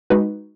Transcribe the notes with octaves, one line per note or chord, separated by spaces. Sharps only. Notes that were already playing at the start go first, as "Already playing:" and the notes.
G#3 D#4 F#4 B4